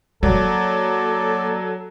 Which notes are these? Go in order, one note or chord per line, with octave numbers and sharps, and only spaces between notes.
F#3 A#3 A4 D5